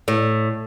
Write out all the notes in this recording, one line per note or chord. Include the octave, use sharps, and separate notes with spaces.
A2